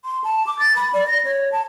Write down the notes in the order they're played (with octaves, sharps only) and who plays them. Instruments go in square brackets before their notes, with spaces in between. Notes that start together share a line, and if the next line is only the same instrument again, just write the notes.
[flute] C6
A5
D6
A6
B5
D5
A#6
C#5
A5